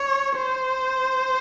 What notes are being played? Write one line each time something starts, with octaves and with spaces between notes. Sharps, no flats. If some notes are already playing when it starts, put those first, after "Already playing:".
Already playing: C#5
C5